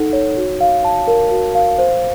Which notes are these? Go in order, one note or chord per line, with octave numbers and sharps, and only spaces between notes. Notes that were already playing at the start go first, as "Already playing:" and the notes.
Already playing: D#4 A4 F#5
C#5
F#4
F5
A5
A#4
F#4
F5
C5